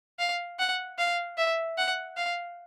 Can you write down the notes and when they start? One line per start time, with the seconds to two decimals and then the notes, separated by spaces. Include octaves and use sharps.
0.19 F5
0.59 F#5
0.98 F5
1.37 E5
1.78 F#5
2.17 F5